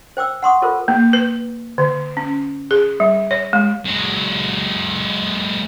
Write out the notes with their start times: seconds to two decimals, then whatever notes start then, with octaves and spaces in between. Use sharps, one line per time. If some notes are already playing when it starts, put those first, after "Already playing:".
0.17 C5 G5 D6 E6
0.43 F#5 A#5 C6 C#6 D#6
0.62 F4 A4 A#4 C5
0.88 A#3
1.13 B4
1.78 D3
2.17 C#4
2.71 G#4
3.00 G3
3.31 C#5
3.53 G#3
3.86 F#3 G#3